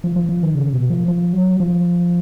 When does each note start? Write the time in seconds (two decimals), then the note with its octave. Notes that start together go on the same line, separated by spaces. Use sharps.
0.04 F3
0.16 F3
0.29 F3
0.43 D#3
0.55 C#3
0.73 B2
0.90 F3
1.08 F3
1.33 F#3
1.60 F3